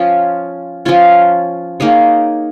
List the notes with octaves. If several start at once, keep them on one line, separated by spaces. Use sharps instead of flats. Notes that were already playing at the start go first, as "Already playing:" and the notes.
Already playing: F3 C#4 F4 C#5
F3 C#4 F4 C#5
A#3 D#4 G#4 C#5